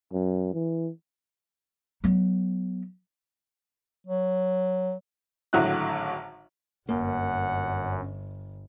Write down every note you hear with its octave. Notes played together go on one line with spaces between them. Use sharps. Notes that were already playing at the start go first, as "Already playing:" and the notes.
F#2
E3
F#3 B3
F#3
G#1 A2 D3 F#3 E5 F#6
G1 F#2 A#3 F#5